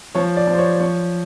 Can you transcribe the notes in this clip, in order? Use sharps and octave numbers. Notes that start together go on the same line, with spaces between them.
F3 C#5
D5
F3
C5
C#5
F3 C#5